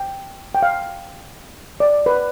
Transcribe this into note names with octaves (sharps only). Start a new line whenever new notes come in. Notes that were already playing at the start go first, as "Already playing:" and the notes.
Already playing: G5
G5
F5
D5
B4